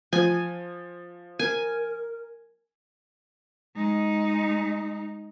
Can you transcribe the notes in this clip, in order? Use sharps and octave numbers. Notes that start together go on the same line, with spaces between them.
F3 G#5
A#4 G#5
G#3 D#4